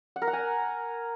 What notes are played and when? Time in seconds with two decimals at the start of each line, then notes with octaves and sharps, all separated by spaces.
0.16 F#5
0.22 A#4
0.27 F#5
0.33 G#5